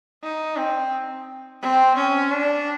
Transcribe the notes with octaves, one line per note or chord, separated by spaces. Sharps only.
D#4
C4
C4
C#4
D4